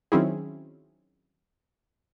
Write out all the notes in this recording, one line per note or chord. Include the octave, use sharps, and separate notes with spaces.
D#3 F#3 C4 C#4 E4 G#4